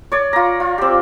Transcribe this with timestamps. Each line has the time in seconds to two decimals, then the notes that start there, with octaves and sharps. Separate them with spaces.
0.12 C#5 D5
0.33 F4 A#5
0.60 F4
0.78 C4 G4